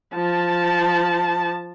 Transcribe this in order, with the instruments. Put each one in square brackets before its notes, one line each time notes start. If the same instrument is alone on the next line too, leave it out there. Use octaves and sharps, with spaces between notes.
[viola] F3 A5